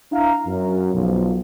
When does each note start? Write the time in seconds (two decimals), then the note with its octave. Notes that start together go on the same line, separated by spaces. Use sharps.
0.12 D4 E4 E5 F5 A#5
0.46 F#2
0.94 B1 F3